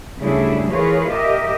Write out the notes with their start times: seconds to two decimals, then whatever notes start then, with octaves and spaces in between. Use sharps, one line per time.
0.20 D2 C#3 G3 D4 E4 G#4
0.70 E3 F4 G#4 A#4 B4 C#5
1.10 A#2 G4 A#4 D#5 E5